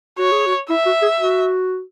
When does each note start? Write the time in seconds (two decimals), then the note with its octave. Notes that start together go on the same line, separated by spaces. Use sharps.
0.18 F#4 C#5
0.32 G#4
0.47 F#4
0.69 E4 E5
0.86 F#4
1.02 G#4
1.20 F#4